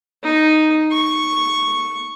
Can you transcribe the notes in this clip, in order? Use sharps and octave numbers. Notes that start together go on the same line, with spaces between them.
D#4
C#6